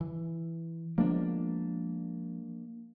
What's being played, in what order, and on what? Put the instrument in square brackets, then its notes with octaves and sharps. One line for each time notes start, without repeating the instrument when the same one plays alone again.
[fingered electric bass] E3
[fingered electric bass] F3 G#3 B3 [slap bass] A#3 D4